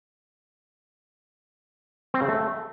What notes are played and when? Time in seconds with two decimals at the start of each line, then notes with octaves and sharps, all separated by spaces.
2.14 C4
2.21 C#3
2.29 A3